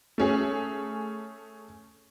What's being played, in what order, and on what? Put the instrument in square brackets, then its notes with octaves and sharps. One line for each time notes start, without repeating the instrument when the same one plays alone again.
[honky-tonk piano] A3 C#4 G#4